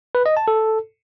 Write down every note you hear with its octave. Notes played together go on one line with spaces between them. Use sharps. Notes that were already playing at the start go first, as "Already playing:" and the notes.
B4
D#5
A5
A4